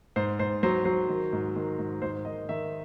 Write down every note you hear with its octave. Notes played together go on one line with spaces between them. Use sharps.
G#2 C5
G#2 C5
F#3 C5
F#3 C5
D#3
G#2
D#3
G#2
G#2 C5
D#3 D#5
D#3 E5